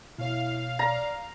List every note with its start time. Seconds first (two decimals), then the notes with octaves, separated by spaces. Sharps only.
0.19 B2 E4 C#5 F5
0.79 D5 A#5